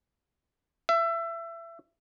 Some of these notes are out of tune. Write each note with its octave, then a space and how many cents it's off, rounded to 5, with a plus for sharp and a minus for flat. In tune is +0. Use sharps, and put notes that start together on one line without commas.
E5 +25